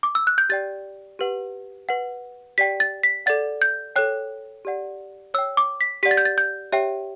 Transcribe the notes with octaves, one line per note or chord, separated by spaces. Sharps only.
D6
E6
F#6
G6
G4 D5 G5 A6
G4 B4 F#5
B4 F#5
G4 D5 G5 B6
A6
B6
A4 D5 F#5 A6
G6
A4 C#5 G5 F#6
G4 D5 F#5
C#5 G5 E6
D6
B6
G4 D5 F#5 B6
A6
G6
A6
G6
G4 C#5 E5 G5